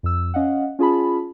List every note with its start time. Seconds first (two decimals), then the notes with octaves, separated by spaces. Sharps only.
0.03 F2 E6
0.34 C#4 D#5 F5 F#5
0.79 C#4 F4 G#4 A5 B5